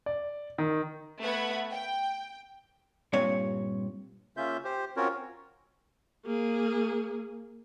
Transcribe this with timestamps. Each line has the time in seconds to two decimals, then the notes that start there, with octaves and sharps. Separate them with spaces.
0.06 D5
0.58 D#3
1.20 A3 B3 F#5 B5 G#6
1.71 G5
3.13 G2 A#2 C4 C#5
4.37 C#3 A#3 C#4 F4 E5 G6
4.64 G4 C5
4.97 C4 C#4 F4 F#4 A#4 C#5
6.26 A#3 G#4